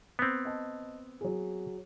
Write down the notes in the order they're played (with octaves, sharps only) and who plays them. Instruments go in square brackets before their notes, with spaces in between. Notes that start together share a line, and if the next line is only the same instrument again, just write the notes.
[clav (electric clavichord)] B3 C4
[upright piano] D#5 A5
F#3 G#4